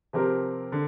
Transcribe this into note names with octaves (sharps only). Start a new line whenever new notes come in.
C3 F3 C4 G4 A#4
D3